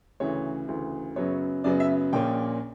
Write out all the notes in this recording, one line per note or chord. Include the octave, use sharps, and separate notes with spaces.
D2 C#3 E3 C#5
D2 C#3 E3
F#2 C#3 F#3 B3 C#5
F#2 C#3 F#3 B3 D5
E5
A#1 A#2 A#3 C#4 G5